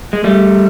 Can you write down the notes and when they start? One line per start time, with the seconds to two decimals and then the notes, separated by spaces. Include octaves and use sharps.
0.13 G#3
0.24 G3 A3